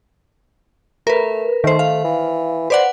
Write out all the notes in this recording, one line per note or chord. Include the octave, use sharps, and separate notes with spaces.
A3 A#4 B4
D#3 A3 C5
A3 F5
E3
B4 C5 D5 F#5